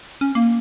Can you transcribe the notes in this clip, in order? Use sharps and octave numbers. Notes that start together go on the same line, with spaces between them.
C#4
A#3